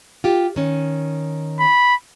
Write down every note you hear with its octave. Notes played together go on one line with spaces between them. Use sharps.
F4 G4
D#3 C#4
B5